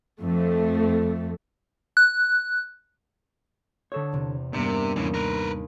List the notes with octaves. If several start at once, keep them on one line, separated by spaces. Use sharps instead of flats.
F2 A3
F#6
D3 A4 C#5
E2 C3
G2 C3 A#3 B3 D4
D#2 E3 C#4
A#4 B4